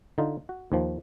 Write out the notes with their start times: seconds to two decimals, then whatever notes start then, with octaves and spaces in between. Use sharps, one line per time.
0.18 D3 D#4 F4
0.49 F#4
0.72 D#2 D#3 F3